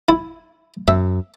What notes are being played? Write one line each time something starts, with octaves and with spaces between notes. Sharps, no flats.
E4
F#2 E5